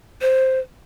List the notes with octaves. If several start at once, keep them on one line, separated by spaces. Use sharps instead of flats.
C5